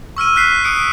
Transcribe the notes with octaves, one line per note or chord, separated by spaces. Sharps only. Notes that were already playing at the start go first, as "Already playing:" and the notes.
C#6 E6 F6 D#7
F6 F#6 B6 C7
D#6 C#7 D7